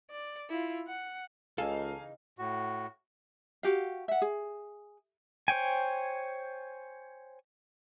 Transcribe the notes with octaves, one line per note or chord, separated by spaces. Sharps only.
D5
E4 F4
F#5
C#2 C#3 E3 D#4 A4 F5 G#5
A2 F#4
F#4 G4 F5
E5 F#5
G#4
C5 C#5 G5 G#5